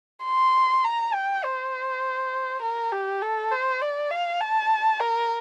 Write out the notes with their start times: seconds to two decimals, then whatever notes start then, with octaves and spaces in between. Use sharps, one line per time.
0.25 C6
0.84 A#5
1.14 G5
1.44 C5
2.62 A#4
2.92 G4
3.22 A4
3.52 C5
3.81 D5
4.10 F5
4.41 A5
5.00 A#4